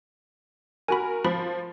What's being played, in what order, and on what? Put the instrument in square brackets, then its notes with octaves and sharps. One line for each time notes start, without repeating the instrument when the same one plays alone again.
[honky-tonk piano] F#4 A#4 [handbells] G#5 B5
[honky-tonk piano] F3 [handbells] B5